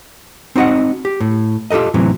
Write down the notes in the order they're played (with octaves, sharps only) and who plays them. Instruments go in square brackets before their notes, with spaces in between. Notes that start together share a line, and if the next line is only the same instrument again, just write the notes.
[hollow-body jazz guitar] C4 D#4 F#4 D#5 F#5
G4
A2
F4 G4 A4 A#4 D#5
A2 C3 E3 F#3